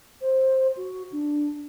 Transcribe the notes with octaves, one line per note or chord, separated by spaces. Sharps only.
C5
F#4
D4